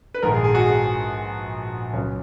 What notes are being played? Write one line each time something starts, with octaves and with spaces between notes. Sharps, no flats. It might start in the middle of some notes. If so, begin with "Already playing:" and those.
B4
A#1 G#2 D#3 A#4
G#4
G#4
F#4
G#4
C#2 C#3 F#3 C#4